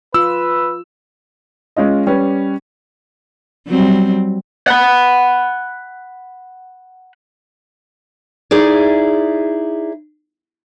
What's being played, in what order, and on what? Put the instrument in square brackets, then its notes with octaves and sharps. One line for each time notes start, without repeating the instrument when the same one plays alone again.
[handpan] F4 [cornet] B4 [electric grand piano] E6
[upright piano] G#3 C#4 F4 D#5
G3 C#4 G4 B4
[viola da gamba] F#3 G3 C4
[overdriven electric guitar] F#5 B5
[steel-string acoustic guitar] D#4 E4 G#4 D5